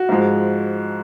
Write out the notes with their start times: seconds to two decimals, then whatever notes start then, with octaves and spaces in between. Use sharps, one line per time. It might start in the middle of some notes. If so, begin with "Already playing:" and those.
Already playing: F#4
0.09 G#2 F3 G#3